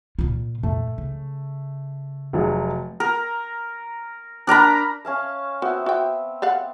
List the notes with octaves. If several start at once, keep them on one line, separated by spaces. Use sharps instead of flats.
A#2 F4
F2 A#2 A3
C#3
F1 F#3 G#4
A#4
D4 A#4 A#5 B5
C#4 F5 A5
B3 C4 F#4 E5
F#4 G5
A4 F5 F#5